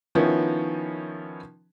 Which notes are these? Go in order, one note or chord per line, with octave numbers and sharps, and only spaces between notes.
D#3 F3 B3 C#4 E4